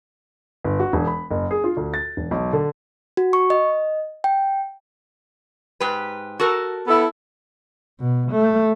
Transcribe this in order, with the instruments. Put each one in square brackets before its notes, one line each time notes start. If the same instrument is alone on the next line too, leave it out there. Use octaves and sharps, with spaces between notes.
[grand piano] G1
F#4
E1
B5
F#1
G#4
F4
D2
A6
E1
B1
D3
[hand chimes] F#4
C#6
D#5
G5
[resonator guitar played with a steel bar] G#2 G4 B4
F#4 A4 A#4
[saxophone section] B3 E4 A4
[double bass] B2
A3